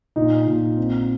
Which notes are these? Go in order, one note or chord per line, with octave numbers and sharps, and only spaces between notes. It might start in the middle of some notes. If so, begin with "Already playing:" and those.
A#2 D#4
A#2
C4